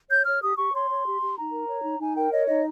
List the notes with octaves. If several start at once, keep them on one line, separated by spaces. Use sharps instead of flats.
C#5 G6
C#5 F6
G4 D#6
G4 C#6
C#5 C6
C#5
G4
G4
D#4 A#5
A#4
C#5
D#4
D#4 G#5
A#4 G5
C#5 D#5
D#4 D#5